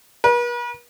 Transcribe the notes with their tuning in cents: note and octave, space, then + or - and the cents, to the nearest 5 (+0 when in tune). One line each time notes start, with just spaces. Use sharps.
B4 -45